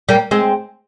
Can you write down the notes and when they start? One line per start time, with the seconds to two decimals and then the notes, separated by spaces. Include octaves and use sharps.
0.09 G3 A#3
0.31 G#3 C4